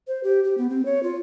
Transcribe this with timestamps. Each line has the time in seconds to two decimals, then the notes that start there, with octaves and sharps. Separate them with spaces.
0.08 C5
0.24 G4
0.44 G4
0.58 B3
0.70 C4
0.85 C#5
1.03 F4